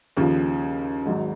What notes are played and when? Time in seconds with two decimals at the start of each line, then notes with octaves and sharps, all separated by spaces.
0.17 D#2 C#3 F3
1.06 G#1 G#2 F#3